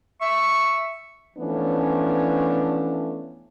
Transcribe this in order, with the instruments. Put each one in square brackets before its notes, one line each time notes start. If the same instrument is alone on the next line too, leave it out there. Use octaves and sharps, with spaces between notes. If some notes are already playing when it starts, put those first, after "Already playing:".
[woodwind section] E5 C#6
[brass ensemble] E3 F3 A3 B3 C#4 D4